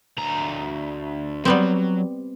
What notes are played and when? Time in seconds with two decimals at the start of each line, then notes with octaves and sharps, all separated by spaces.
0.18 D2 A#5
1.45 F#3 G3 B3 C4